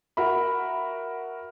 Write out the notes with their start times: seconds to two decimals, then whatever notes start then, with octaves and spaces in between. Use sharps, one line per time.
0.17 F#4 A#4 E5 B5